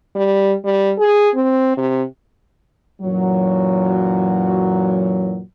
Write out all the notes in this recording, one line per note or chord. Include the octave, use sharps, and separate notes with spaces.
G3
G3
G#4
C4
C3
F#2 A#2 E3 F#3